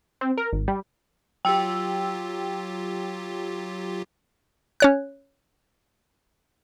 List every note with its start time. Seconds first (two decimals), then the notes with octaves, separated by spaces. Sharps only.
0.21 C4
0.38 A#4
0.52 G#1
0.68 G3
1.45 F#3 F4 G4 G5 E6
4.80 C#4 C#5 F#6